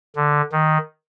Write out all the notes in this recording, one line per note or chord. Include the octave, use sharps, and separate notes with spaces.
D3
D#3